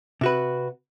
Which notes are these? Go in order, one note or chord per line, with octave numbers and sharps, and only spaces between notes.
C3 F#4 B4